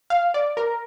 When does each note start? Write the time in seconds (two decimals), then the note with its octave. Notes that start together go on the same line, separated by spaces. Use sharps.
0.10 F5
0.34 D5
0.57 A#4